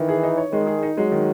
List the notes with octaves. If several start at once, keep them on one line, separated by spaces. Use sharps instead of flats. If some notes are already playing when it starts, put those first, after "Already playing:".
Already playing: D#3 E3
G#4
D#4
C#5
D#3 G#3
G#4
D#4
F#3 G#3
D#3